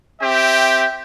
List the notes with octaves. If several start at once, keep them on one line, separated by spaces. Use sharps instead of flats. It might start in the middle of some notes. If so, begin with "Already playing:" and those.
C4 G4 E5 G5